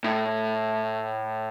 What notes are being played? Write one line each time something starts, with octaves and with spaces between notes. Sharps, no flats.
A2